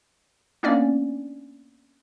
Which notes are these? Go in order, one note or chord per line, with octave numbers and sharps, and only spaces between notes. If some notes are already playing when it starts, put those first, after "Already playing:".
A#3 B3 C#4 D4 D5